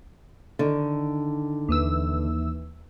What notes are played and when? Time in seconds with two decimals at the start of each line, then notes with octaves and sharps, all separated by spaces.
0.59 D3 D#3
1.69 D#2 E3 E6